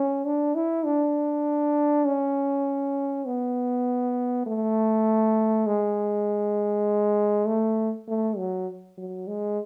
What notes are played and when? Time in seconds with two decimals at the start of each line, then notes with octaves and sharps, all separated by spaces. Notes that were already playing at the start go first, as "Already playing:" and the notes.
Already playing: C#4
0.25 D4
0.55 E4
0.85 D4
2.05 C#4
3.26 B3
4.46 A3
5.66 G#3
7.47 A3
8.08 A3
8.37 F#3
8.98 F#3
9.28 G#3